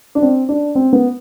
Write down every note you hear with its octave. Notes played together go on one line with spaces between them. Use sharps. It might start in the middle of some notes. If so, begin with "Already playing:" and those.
D4
C4
D4
C4
B3